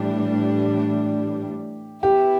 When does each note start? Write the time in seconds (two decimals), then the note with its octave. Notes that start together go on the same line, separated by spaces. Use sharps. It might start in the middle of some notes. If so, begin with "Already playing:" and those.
Already playing: A2 E3 G3 D4 G4
2.03 E3 B3 E4 G4